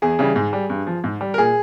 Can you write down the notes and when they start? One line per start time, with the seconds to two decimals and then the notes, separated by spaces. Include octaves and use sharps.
0.02 E2 G#4
0.19 C#3 E3 G3
0.36 G#2
0.53 G3
0.70 G2
0.87 F3
1.04 G#2
1.21 G3
1.34 A#4
1.38 A#2 G#4